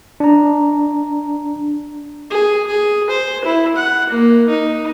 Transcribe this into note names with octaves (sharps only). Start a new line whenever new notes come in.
D4 A#5
G#4
G#4
C5
E4
F#5
A#3
D#4